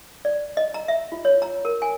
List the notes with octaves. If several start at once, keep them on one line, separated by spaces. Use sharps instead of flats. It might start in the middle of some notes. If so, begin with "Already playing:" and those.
D5
D#5
A#5
E5
F4
C#5
A#5
A#4
G#5